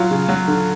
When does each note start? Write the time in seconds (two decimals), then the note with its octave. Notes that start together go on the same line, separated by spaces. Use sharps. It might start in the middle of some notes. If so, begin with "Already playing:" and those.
Already playing: F#3 F4
0.11 C#3
0.29 F#3
0.48 D3